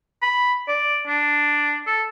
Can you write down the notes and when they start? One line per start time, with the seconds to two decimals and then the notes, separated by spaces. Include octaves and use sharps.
0.22 B5
0.68 D5
1.07 D4
1.86 A4